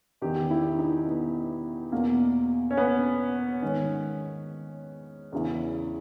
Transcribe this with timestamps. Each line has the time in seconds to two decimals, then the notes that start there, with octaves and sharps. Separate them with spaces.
0.21 E2 D#3 G4
0.50 E4
0.79 D#4
1.07 B3
1.92 E2 B2 A#3
2.71 C#4
2.77 B3
3.62 G#2 D#3 C#4
5.32 E2 C#3 E3